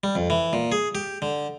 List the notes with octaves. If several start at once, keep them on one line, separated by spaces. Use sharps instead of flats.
G3
F2
E3
A#2
G#4
G4
D3